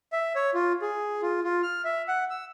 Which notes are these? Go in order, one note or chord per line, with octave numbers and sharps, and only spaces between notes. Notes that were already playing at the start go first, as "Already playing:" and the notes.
E5
C#5
F4
G#4
F4
F4
F6
E5
F#5
E6